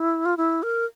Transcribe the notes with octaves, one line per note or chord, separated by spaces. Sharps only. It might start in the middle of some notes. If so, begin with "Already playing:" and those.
Already playing: E4
F4
E4
A#4